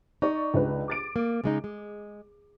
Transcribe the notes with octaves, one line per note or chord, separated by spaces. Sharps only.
D#4 D5 C#6
C#2 D4 B4
D6 A6 D7
A#3
C#3 G#3 D#4
G#3